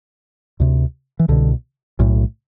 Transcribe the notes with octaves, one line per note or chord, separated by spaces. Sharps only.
D2 C3
E3
C2 B2 D3
B1 A2